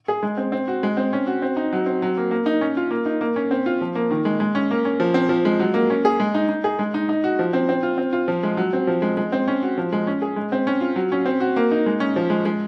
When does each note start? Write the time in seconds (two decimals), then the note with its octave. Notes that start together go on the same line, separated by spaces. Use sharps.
0.08 G#4
0.23 G#3
0.37 C4
0.52 C4
0.68 F#4
0.83 G#3
0.97 C4
1.13 C#4
1.27 F#4
1.42 C4
1.56 D#4
1.73 F#3
1.86 C4
2.02 F#3
2.17 A#3
2.31 A#3
2.46 D#4
2.61 C#4
2.77 F4
2.91 A#3
3.06 D#4
3.21 A#3
3.36 C#4
3.51 C4
3.66 F4
3.81 F3
3.95 A#3
4.11 D#3
4.25 G#3
4.40 G#3
4.55 C#4
4.71 A#3
4.85 C#4
5.00 F3
5.14 C4
5.29 F3
5.45 G#3
5.59 F#3
5.74 A#3
5.90 C#4
6.05 G#4
6.20 G#3
6.34 D#4
6.49 D#4
6.64 G#4
6.79 G#3
6.94 D#4
7.09 D#4
7.24 F#4
7.39 F3
7.53 C4
7.69 C4
7.83 F4
7.98 C4
8.13 F4
8.28 F3
8.43 G#3
8.57 F#3
8.73 C4
8.87 F3
9.02 G#3
9.17 G#3
9.32 C4
9.48 C#4
9.63 F#4
9.78 F3
9.93 G#3
10.07 C#4
10.22 G#4
10.36 G#3
10.52 C4
10.67 C#4
10.81 F4
10.96 F#3
11.12 C#4
11.26 C4
11.40 F#4
11.56 A#3
11.71 D#4
11.86 G#3
12.00 C#4
12.16 F3
12.30 G#3
12.45 G#3